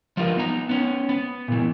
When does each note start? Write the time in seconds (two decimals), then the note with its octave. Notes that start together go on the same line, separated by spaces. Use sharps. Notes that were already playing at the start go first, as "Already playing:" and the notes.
0.17 F3 G3 F4 A#4 B4
0.37 B3 D#4 A#5
0.69 B3 C#4
1.09 B3
1.48 A#2 E3